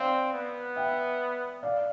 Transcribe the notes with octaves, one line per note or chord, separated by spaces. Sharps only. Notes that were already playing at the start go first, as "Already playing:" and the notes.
Already playing: C4 D5 F5
B3
E5 G5
D5 F5